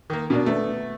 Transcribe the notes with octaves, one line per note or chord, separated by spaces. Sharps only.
D#3 A#3
B2 A#3 D4
A3 B3